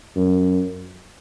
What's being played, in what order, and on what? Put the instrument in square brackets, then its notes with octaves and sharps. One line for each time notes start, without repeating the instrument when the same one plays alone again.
[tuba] F#2